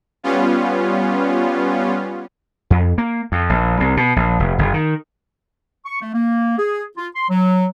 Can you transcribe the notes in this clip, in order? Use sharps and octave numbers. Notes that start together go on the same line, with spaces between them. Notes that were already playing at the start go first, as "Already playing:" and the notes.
G3 B3 C#4 F4
F2
A#3
F2
A#1
C2
B2
A#1
F1
F#1
D#3
C#6
A3
A#3
G#4
F4
C6
F#3